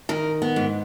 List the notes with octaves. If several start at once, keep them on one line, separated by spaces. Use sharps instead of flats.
D#3 A#4
B3
G#2